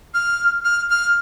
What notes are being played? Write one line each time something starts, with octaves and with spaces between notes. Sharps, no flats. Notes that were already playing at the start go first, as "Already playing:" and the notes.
F6
F6
F6